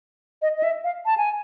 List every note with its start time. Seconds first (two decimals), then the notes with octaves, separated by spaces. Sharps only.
0.42 D#5
0.58 D#5
0.63 E5
0.84 F5
1.06 A5
1.17 G#5